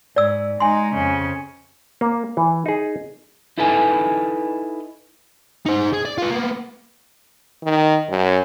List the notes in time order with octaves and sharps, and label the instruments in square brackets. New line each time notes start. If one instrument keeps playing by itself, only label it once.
[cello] G#2 [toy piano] D5 E6
[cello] G#3 D#4 [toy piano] G#5 C6
[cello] F2 C#3
[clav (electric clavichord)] A#3
E3
D#4 G#4
[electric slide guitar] D#4 E4 A4 B4 G#5
[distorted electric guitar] D#4 C5
G#4
D5
F4 B4
A#3 B3
[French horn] D#3
F#2